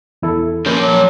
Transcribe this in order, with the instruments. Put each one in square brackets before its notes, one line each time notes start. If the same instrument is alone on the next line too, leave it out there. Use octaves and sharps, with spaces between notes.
[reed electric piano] E2 E4 A4
[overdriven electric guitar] F3 A#3 [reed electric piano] C#4 B4 G6
[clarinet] F#3 [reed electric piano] D6